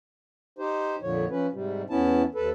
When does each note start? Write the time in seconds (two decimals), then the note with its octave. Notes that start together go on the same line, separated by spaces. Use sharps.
0.59 D#4 G4 C5
1.02 F2 A#2 D3 F3 C#5
1.30 F3 C#4 B4
1.53 G#2 C3 G3
1.90 E2 B3 C#4 E4 A5
2.35 D#2 A4 B4